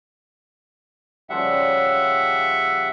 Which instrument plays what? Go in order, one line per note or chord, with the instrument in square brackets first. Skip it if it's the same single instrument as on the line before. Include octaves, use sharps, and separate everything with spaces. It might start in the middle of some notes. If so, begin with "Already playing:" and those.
[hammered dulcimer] C#3 F3 G3 [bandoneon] E5 F#5